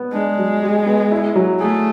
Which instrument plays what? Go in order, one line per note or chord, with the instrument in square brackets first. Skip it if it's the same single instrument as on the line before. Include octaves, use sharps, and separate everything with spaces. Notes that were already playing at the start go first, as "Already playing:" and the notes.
Already playing: [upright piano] B3
[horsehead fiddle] G#3 [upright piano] D4
[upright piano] F#3
G4
B3
E4
F#3
[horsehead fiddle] A3 [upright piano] G#4